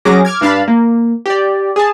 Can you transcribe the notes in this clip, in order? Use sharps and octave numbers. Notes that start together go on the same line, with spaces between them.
F#2 F#3 C#4 G#4 D6 A#6
D6 F6 G#6
G2 D4 F5 A5 B5
A#3
G4 D5
G#4 A5